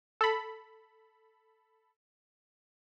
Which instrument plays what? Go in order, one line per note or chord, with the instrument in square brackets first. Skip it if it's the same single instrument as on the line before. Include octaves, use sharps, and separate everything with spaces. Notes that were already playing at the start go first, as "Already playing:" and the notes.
[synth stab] A4 B5